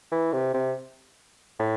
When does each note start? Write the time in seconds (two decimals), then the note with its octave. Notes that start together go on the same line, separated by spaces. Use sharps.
0.12 E3
0.33 C3
0.54 C3
1.59 A2